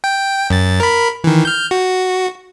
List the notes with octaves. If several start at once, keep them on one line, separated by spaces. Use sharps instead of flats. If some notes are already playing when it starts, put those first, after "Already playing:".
G5
F#2 A6
A#4 B5
D#3 E3
F6 G6
F#4